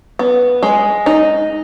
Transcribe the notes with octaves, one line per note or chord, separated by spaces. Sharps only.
B3
G#3
D#4